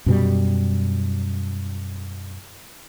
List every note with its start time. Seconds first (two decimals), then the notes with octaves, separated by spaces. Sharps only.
0.06 F#2 B2 G3